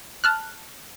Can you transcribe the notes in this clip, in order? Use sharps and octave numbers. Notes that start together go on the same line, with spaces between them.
A5 F6 F#6